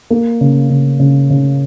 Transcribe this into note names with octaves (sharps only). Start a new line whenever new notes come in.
A#3
C#3
C#3
C#3
C#3